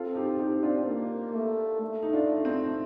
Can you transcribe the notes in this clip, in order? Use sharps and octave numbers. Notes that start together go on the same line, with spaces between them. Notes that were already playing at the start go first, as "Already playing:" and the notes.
Already playing: C4 F4 A4
D#4 G4
D#4 G4
D4 F4
A#3
A3
A3
D#4
D4 F4
C4 D#4